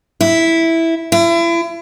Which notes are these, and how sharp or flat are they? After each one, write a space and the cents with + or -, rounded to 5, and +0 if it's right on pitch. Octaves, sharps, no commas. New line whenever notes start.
E4 -5
E4 +35